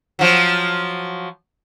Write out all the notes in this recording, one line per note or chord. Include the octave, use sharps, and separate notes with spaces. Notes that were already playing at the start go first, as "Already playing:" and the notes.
F3 F#3